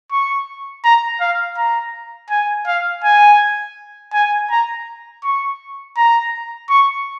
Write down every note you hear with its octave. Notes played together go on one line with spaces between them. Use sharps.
C#6
A#5
F5
A#5
G#5
F5
G#5
G#5
A#5
C#6
A#5
C#6